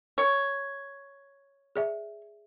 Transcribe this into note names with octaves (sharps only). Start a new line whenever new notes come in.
C#5
G#4 D5 E5